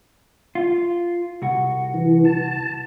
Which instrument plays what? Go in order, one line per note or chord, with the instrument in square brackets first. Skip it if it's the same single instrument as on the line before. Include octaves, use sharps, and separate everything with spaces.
[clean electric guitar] F4
C2 F#4
[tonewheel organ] E3
A5